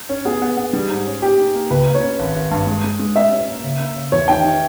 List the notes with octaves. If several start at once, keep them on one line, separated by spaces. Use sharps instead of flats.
C#4
B3 G#4
B3
B3
G3
G#2
C#4
A#3 G4
D#4
A#3
C#2 B4
A#3
C#5
C#4
G#1
G#1
G2
G#3
G#3
G#3
C#4 E5
C#4
A#3
C#3
A#3
C#3
E2 C#5
D#3 G5
D#3